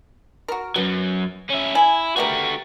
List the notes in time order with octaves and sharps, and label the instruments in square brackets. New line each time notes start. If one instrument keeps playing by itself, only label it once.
[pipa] F#4 A#4
[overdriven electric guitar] F#2 F#3 [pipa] B3
[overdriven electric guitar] C#4 E4
[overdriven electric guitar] E4 [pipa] G#5
[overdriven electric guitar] A3 F#4 [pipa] B3 G4 A#4